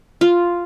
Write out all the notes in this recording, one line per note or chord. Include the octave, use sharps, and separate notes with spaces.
F4